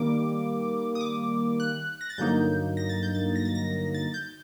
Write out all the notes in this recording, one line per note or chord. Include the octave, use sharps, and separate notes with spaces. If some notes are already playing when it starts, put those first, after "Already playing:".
Already playing: D#3 G3 A#3 D6
D#6
D6
F#6
A#6
A6
G2 D3 F#3 A#3 D#4 G6
A#6
A6
G6
A6
A#6
A6
A#6
A6
G6